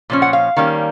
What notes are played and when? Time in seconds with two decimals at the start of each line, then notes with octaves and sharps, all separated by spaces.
0.10 A#2 F3 C#4
0.22 F#5
0.33 F5
0.57 D#3 G3 A#3 C#4